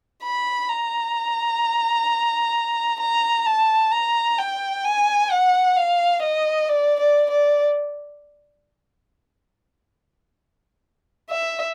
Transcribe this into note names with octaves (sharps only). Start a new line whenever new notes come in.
B5
A#5
A#5
A5
A#5
G5
G#5
F#5
F5
D#5
D5
D5
D5
E5